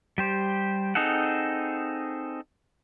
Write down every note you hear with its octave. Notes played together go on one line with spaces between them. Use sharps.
G3 G4 C5
C4 D#4 G#4 A4 F#5